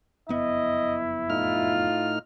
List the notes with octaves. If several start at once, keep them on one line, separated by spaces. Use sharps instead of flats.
F#1 F2 B3 E4 D#5
A2 D#4 F4 F6